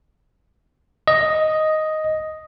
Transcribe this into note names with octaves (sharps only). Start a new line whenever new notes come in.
D#5